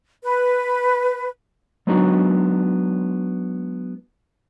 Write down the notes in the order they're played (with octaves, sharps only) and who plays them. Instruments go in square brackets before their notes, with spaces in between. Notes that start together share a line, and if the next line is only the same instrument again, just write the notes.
[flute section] B4
[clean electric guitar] F#3 G#3 B3 D4 D#4 F#4